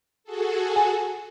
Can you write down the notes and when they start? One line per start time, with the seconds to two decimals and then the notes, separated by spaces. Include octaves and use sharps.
0.24 F#4 G#4 A4
0.76 G#5